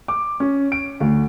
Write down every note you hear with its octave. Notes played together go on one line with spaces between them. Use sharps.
D6
C#4
D7
D2